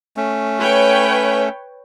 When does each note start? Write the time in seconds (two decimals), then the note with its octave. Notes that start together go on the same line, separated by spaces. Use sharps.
0.17 A3 C#4
0.60 B4 C#5 G5